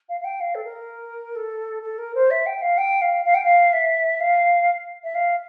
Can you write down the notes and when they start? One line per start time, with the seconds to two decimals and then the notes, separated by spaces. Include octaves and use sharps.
0.09 F5
0.20 F5
0.24 G5
0.40 F5
0.54 A4
0.64 A#4
1.35 A4
1.83 A4
1.98 A#4
2.14 C5
2.30 E5
2.46 G5
2.61 F5
2.77 G5
3.01 F5
3.25 F5
3.34 G5
3.44 F5
3.72 E5
4.20 F5
5.03 E5
5.14 F5